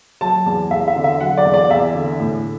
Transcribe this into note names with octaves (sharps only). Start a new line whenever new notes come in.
F#3 A5
E2
E2 E5
E5
D3
E5
F#3 F#5
D5
E2
D5
E2 E5
D3
A2